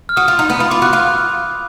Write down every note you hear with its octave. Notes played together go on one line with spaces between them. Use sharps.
F6
F#4 D#6
F4
D#4
B3
F4 B5
F4 D6
F#4 F#6
F4